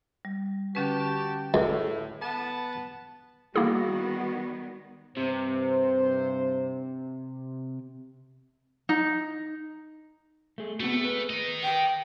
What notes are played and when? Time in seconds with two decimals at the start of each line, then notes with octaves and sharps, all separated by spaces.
0.25 G3
0.75 D3 C#4 F#4 G4 B4 A5
1.54 C#2 A2
2.21 B3 A5
3.56 D#3 G3 A#3 B3 E4 F#4 G#4
5.17 G2 C3 C5
8.89 D#4
10.58 A3 G#4
10.80 A3 B3 C4 F#4
11.01 G#4 B4
11.30 A#4 B4 D#5
11.64 G5